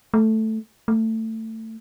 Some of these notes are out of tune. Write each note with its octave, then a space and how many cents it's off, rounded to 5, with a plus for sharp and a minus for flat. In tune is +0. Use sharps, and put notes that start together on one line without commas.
A3 +0
A3 +20